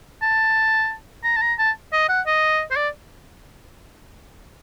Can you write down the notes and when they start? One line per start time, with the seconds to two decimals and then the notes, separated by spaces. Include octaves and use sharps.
0.22 A5
1.24 A#5
1.36 A5
1.42 A#5
1.59 A5
1.92 D#5
2.09 F#5
2.26 D#5
2.71 C5
2.76 D5